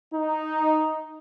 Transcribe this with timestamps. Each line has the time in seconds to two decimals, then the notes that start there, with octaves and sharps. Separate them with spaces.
0.14 D#4